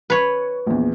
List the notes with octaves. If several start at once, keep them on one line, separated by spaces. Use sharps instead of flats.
B4 C#5
A#1 E2